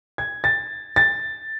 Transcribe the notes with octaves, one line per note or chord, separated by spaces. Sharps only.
G#6
A6
A6